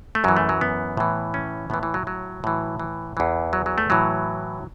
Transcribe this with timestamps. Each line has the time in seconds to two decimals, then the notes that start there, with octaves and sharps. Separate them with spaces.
0.15 A3
0.24 F#2 E3 F#3
0.37 A3
0.49 F#3
0.61 B3
0.97 A2 E3
1.34 C#4
1.70 A2 E3 B3
1.83 E3
1.94 F#3
2.07 F#3
2.44 A2 E3
2.80 E3
3.17 E2 E3
3.53 F#3
3.66 F#3
3.78 A3
3.90 A2 E3 F#3